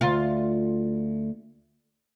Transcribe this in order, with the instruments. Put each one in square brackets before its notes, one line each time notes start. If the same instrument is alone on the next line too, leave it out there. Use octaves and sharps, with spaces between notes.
[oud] D2 F4